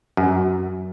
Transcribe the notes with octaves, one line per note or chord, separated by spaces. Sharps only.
F#2